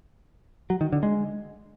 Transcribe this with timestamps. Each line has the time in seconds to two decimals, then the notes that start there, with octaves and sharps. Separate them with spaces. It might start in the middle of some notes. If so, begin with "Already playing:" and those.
0.70 F#3
0.81 D#3
0.93 D3
1.03 G#3